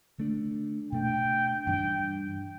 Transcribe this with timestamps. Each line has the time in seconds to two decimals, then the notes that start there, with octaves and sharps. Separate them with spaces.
0.18 D3 A3 D4
0.92 B2 A3 D4 G5
1.66 G2 E3 G3 D4 G5